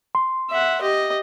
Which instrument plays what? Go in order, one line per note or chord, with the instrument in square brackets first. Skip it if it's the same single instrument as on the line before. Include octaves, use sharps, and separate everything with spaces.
[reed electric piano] C6
[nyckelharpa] E5 F#5
G4 D#5